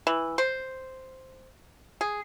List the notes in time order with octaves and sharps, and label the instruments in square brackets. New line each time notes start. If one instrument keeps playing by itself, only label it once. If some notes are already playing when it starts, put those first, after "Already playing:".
[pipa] E3
C5
G#4